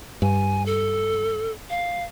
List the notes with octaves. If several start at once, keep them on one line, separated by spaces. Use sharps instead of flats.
G2 G#5
A4
F5